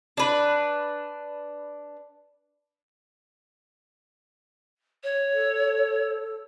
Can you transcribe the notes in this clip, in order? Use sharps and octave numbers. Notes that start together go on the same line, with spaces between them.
D4 B4
C#5
A4